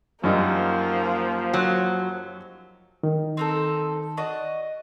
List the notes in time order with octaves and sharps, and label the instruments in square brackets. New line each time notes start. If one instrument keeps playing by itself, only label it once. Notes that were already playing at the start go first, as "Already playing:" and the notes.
[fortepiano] F#2 G3 D#4 [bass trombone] F3 [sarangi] A#3
[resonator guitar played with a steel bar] F#3
[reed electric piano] D#3
[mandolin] C4 D#4 A4
F#4 D5 D#5